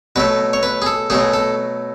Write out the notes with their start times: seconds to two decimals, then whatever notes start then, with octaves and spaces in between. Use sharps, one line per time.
0.16 B2 F#3 A3 B4
0.53 C#5
0.63 B4
0.82 G#4
0.86 A4
1.10 B2 F#3 A3 G#4
1.34 A4